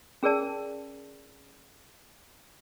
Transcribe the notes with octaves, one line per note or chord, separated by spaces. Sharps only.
C#4 G#4 A#4 D5 A5